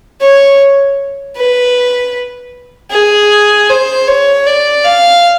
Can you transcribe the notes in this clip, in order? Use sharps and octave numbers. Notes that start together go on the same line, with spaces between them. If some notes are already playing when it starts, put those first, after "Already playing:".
C#5
B4
G#4
C5
C#5
D5
F5